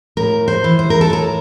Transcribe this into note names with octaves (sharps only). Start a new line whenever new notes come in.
A2 A#4
C5
E3
C5
A#4
A4
A2 A#4